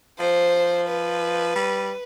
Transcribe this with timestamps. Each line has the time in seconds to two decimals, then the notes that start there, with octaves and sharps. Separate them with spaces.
0.19 F3 C5
0.88 B4
1.56 G3